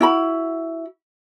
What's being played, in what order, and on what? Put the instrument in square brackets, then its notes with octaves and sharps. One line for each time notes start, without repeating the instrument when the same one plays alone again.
[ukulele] E4 F#4 B5